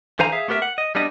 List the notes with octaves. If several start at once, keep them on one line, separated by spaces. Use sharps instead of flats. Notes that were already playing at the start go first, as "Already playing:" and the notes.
D3 E3 C5 F5 G#5 A#5
G#4 E5 F5
A3 B3 G4 A#4 E5
F#5
D#5
G3 B3 D4 D#5